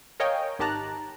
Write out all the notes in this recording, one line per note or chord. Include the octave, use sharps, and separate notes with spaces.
A#4 C#5 D#5 F5 G5 G#5
G#1 D#3 G4 A5 A#5 F#6